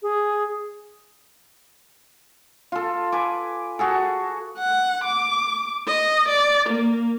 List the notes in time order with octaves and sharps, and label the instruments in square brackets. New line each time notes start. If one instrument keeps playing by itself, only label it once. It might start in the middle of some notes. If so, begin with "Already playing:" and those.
[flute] G#4
[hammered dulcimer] F4 A4
B4 G#5 D6
F#4 G#4 A4
[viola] F#5
D6
D#5
D5
A#3